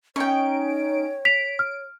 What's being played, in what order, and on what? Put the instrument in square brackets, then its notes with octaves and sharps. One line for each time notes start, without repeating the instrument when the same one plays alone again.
[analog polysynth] C#4 D#4 D7 [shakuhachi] C#5 [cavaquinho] G5 C#6
[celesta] B6 F7 [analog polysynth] D7
[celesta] F6